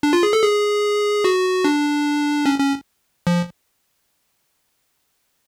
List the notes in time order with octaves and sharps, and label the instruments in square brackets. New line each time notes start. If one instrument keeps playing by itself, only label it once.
[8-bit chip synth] D4
F4
G#4
A4
G#4
F#4
D4
C#4
C#4
F3